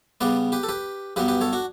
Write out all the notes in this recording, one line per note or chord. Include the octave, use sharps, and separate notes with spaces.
C#3 G3 B3 B4 D5
G4 B4
A4
G4 B4
G2 F#3 B3 G4 B4
G4 B4
A4 C#5
D4 F#4